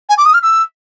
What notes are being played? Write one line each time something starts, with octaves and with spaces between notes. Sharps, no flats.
G#5
D6
D#6
F6
E6